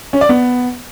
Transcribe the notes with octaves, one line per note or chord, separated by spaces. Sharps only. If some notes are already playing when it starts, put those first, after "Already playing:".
C#4
D5
B3